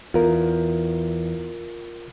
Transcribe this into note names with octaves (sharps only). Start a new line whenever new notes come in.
E2 F4 A#4